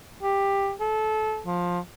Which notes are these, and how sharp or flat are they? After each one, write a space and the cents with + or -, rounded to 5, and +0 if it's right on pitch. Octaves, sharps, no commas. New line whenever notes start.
G4 +10
A4 -25
F3 +15